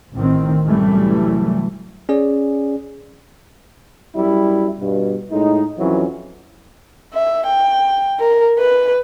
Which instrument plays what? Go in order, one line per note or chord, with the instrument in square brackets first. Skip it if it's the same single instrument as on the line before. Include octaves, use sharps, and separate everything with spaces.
[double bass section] A1 A2 D#3 C4
C2 F#2 E3 G3 A3
[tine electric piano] C#4 G#4 D5
[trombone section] F#2 G3 E4
G2 B2
A2 G#3 D#4
F2 E3 F#3 C#4
[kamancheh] E5
G5
A#4
B4